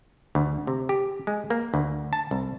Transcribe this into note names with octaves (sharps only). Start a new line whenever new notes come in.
D2
C3
G4
G#3
A#3
D2
A5
C2